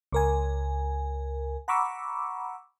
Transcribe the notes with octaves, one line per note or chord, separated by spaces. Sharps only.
C#2 A#4 G#5
F#5 A#5 B5 C#6 D6 E6